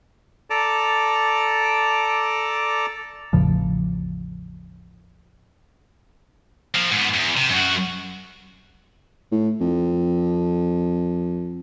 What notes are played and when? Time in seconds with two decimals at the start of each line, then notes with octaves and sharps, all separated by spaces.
0.50 A4 D5 A5 A#5 D6
3.33 A1 E2 C#3 F3
6.75 F3 A#3
6.92 G#2 B3
7.14 E2
7.37 C3
7.50 F#2 F#4
9.31 A2
9.61 F2